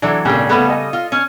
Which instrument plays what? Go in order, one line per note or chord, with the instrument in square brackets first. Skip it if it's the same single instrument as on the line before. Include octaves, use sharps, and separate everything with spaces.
[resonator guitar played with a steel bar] E3 F#3 A4 [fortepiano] D4
[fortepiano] G#1 A#2 C#3 [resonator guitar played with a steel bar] D4
[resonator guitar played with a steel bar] C#3 G3 [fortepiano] A3 B3 C#4
[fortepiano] A4 D#5
[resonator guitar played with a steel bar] F4
C#4